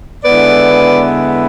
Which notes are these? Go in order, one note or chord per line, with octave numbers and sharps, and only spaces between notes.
D3 G#3 B3 E4 B4 D5